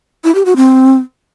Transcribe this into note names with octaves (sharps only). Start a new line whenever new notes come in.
E4
G4
F#4
C4